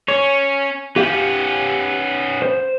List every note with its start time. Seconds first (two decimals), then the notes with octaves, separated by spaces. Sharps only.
0.08 C#4 C#5
0.96 B3 C#4 G4 F5 G6
2.42 C5